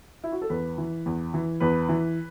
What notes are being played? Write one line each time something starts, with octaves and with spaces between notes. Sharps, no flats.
E4
F#4
A4
E2 B4
E3
E2
E3
E2 B4
E3